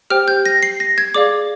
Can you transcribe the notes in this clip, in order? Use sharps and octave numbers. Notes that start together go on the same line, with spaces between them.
G4 C5 G5 F6
G6
A#6
C7
A#6
G#6
G#4 D5 F5 D6